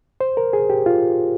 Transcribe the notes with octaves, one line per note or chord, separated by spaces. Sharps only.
C5
A#4
G#4
G4
F4